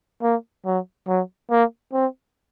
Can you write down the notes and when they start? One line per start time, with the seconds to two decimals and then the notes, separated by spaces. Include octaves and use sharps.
0.23 A#3
0.66 F#3
1.08 F#3
1.51 A#3
1.93 C4